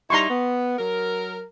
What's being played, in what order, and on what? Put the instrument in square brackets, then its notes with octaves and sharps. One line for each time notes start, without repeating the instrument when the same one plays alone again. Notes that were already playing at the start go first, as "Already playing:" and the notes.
[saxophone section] G3 D#4 E4 [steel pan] A#5 C6 C#6
[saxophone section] B3
F#3 A#4